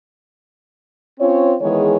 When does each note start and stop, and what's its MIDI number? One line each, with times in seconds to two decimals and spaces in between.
1.19 1.54 60
1.19 1.54 61
1.19 1.54 65
1.19 1.54 72
1.19 1.54 73
1.60 1.97 51
1.60 1.97 52
1.60 1.97 56
1.60 1.97 59
1.60 1.97 68
1.60 1.97 73